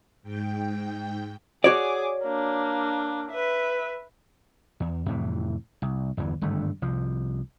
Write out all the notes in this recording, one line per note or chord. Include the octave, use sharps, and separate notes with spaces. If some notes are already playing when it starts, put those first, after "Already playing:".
G#2 G5
F#4 G#4 C#5 D5 D6
A#3 D4
B4 E5
E2
F2 A2 C3 E3
C2
G1 E2 E3
G#1 G2 D3 A3
C2 F3